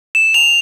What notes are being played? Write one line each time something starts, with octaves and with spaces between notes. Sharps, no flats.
E7
F7